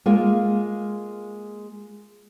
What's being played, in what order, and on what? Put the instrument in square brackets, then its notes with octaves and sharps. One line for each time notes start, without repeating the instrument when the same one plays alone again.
[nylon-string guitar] G#3 A#3 F4